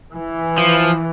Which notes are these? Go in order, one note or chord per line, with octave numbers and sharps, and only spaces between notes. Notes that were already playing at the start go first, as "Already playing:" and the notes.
E3
F3